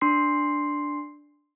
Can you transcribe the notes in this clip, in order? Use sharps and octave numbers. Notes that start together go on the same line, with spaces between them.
D4 C6 C7